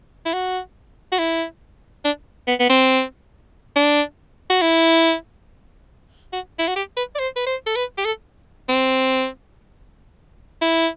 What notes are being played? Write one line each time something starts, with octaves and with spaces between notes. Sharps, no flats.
E4
F#4
F#4
E4
D4
B3
B3
C4
D4
F#4
E4
F#4
E4
F#4
G4
B4
D5
C5
B4
C5
A4
B4
G4
A4
C4
E4